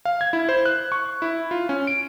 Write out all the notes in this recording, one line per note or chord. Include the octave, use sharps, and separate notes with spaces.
F5
G#6
E4
C5
F#6
C#6
E4
F4
C#4
D7